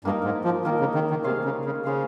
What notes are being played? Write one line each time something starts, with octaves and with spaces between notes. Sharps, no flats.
G2 A#3 D#4 A#4
G#2
F3
D#3 A#3 D#4 A#4
C#3
D#3
D#3
C3 C#4 G#4 C5 F5
C#3
C#3
C#3 C#4 G#4 C5 F5